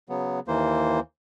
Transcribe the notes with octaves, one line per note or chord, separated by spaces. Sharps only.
C#3 F#3 B3
D#2 E3 A#3 C5